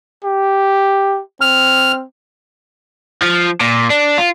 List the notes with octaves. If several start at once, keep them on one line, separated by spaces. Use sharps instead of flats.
G4
C4 F6
F3
A#2
D4
F4